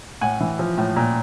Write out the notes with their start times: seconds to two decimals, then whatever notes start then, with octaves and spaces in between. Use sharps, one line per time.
0.21 A2 F#5 G#5
0.40 E3
0.59 F3
0.78 A2
0.96 A#2